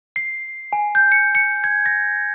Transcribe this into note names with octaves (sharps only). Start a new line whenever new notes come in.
C7
G#5
G6
C#7
C#7
G#6
A#6